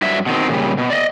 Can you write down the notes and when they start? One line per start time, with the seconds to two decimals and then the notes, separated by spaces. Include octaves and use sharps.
0.02 G2 F#3 E5
0.26 B2 D#3 C4
0.49 A#2 C#3 G3
0.78 B2
0.90 D5 D#5